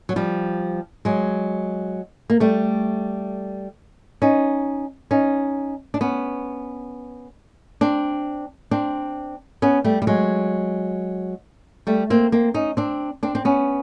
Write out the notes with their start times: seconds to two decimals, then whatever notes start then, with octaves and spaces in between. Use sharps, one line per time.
0.09 F#3
0.16 F3 G3
1.05 F#3 G#3
2.30 A#3
2.40 G3 A3
4.22 C#4 D#4
5.11 C#4 D#4
5.94 D4
6.01 B3 C#4
7.81 C4 D4
8.71 C4 D4
9.62 B3 C#4
9.84 G3 A3
10.02 G3
10.07 F#3 G#3
11.87 G3 A3
12.10 A#3 C4
12.32 A#3 C4
12.54 C#4 D#4
12.77 C4 D4
13.23 C4 D4
13.35 C4
13.45 B3 C#4